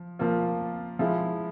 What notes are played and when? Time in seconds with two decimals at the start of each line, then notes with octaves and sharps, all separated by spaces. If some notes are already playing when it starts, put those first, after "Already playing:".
Already playing: F3
0.19 F3 A#3 F4
0.99 F3 G#3 E4